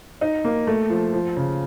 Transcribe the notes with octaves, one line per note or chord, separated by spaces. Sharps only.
D#4
A#3
A3
F3
F3
C#3